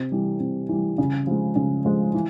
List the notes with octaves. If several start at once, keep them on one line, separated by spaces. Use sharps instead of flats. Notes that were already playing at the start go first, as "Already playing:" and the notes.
Already playing: C3
E3 G3
C3
E3 G3
C#3
F3 G#3
C#3
F3 G#3
E3